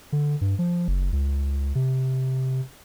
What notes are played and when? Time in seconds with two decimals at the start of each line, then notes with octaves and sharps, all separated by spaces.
0.12 D3
0.41 G2
0.59 F3
0.88 F#1
1.12 C#2
1.75 C3